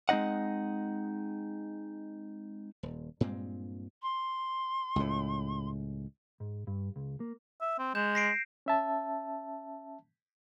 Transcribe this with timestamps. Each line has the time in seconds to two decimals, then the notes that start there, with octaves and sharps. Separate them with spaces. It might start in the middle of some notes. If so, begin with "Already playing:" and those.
0.09 G#3 C4 D#4 D#5 F#5
2.83 D#1
3.21 G2 A#2 G#3 C4
4.02 C6
4.96 C#2 A2
6.40 G#2
6.67 G2
6.96 C#2
7.20 A#3
7.61 E5
7.79 C4
7.95 G#3 G6 E7
8.15 A#6 C7 D7
8.66 C#4 E5 A5